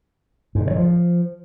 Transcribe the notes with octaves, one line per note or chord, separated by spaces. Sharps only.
G#2
D3
B2
F#3
F3